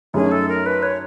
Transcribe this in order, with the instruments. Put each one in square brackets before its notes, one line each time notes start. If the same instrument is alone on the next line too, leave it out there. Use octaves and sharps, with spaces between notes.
[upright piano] F#2 D#3 F#3 A3 C#4 [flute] G#4
[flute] A4
A#4
B4
C#5